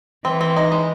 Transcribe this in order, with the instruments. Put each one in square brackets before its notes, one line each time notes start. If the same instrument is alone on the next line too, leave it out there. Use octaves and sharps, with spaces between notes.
[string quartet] E3 [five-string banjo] C4
[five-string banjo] C4
D#4
G#3